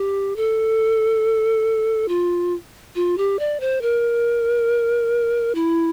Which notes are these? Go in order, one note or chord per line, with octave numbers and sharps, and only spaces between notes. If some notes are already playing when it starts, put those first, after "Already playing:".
Already playing: G4
A4
F4
F4
G4
D5
C5
A#4
E4